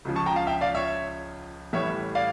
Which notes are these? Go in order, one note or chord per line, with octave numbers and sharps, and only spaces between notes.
C#2 C#3 F3
A5 C#6
G5 A#5
F5 A5
E5 G5
D5 F5
C#5 E5
A1 A2 E3 G3 C#5 E5
D5 F5